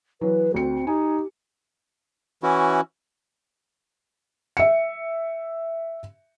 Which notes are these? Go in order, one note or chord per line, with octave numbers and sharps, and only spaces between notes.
E3 F#3 B4
D2 C4 F#4 C#7
D#4 G4 G#5
E3 C#4 E4 F#4
E5 C#7